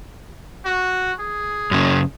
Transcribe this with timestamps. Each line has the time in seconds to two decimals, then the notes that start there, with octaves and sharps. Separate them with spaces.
0.65 F#4
1.20 G#4
1.71 F#2 C#3